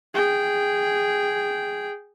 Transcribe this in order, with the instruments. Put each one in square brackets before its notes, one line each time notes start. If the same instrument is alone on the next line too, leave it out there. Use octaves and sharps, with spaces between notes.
[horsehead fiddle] G#4 G5